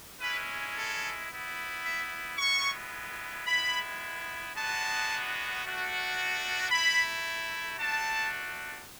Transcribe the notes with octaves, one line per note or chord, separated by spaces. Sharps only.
G#3 C#4 E4 B4
A4
B3 E4
E5
G#3 B3 E4 C#6
G#3 B3 E4 B5
G#3 B3 D4 F#4 A5
A3 D4 F#4
A3 E4 B5
A3 D4 F#4 A5